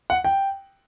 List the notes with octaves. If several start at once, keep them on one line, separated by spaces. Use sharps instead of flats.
F#5
G5